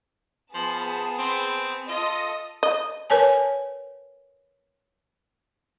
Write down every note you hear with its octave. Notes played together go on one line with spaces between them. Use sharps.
F3 B3 G#4 A5
C4
F4 A4 D#5
D#5
A#4 B4 C#5 G#5 A5